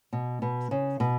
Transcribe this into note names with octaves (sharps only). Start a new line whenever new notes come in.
B2
B2
C#3
B2